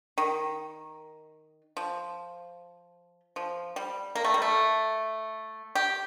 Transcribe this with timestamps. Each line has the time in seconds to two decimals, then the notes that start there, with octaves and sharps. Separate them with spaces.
0.18 D#3
1.77 F3
3.36 F3
3.76 G3
4.15 A#3
4.24 A3
4.34 G3
4.42 A3
5.75 G4